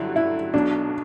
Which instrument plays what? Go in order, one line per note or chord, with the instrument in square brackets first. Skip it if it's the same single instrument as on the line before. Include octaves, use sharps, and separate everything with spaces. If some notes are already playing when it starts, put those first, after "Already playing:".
Already playing: [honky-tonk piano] G2 D3 F#3 [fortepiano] E4
[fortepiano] E4
[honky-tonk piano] B1 B2 F#3 [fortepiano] D4